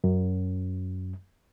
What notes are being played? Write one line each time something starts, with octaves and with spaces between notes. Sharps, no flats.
F#2